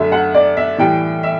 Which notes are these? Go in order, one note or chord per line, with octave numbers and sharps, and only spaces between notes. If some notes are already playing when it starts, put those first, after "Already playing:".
Already playing: F#2 D3 A3 E5
F#5
D5
E5
A2 E3 G3 G5
E5